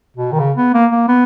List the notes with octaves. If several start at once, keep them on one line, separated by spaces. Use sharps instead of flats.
B2
D#3
C#3
B3
A#3
A#3
B3